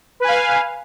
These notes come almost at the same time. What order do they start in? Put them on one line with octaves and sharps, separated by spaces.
B4 G#5 F5